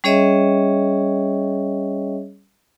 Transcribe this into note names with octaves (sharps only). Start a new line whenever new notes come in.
G3 C#4 G#4 C#5 D#5 E5